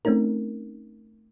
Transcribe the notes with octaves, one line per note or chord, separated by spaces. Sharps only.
A3 C4 C#4 D#4 A#4